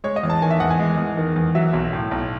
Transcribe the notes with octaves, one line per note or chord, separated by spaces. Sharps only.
G#3 C#5
D#5
E2
A5
D#3 G#5
E5
E2 F#5
G#5
G#3
E2
D#3
E2
F#3 E5
B1
A2
B1